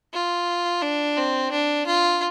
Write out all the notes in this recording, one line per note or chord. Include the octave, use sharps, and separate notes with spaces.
F4
D4
C4
D4
F4